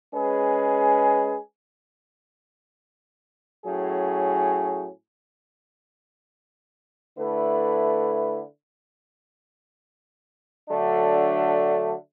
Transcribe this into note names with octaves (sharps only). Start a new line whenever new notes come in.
G#3 C#4 G#4 B4
A2 F#3 C#4 G#4
D3 A3 E4 B4
D3 F#3 A3 D4